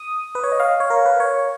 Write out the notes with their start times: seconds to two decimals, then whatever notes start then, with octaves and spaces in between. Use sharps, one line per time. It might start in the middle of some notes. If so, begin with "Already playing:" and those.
Already playing: D#6
0.35 B4
0.44 C#5
0.52 D#5
0.60 F5
0.80 C#5
0.90 A#4
1.06 B4
1.20 C#5